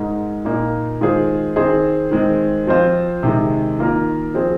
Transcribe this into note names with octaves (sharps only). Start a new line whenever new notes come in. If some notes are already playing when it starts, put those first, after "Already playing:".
Already playing: G#2 G#3 D#4 A#4
A#2 A#3 D#4
D#3 G#3 F4 G#4 C5
D#3 C4 G#4 C5
D#3 G#3 C4
F3 C4 F4 C5
C3 D#3 G#3
D#3 A#3 F4 A#4
F3 C4 G#4 C5